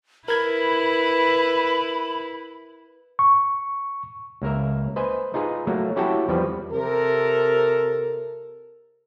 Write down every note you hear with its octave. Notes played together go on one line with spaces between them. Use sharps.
E4 A#4 B4 B5 G#6
C#6
C#2 A#3 A#4 E5
B4 C5 D#5 G#5
D#4 F4 G#4 B4
F#3 A3 A#3
C#4 E4 F#4 G4 G5 A5
E2 F3 G3 C4 B4
C3 A4 A#4